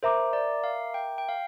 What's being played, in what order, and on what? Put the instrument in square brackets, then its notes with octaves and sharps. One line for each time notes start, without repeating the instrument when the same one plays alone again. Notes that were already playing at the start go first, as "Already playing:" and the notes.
[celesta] A#4 E5 A#5 D6 [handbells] C5
[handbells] D5
F5
G5
G5
F5